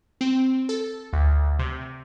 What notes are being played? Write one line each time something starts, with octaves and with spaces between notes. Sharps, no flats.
C4
A4
D2
C3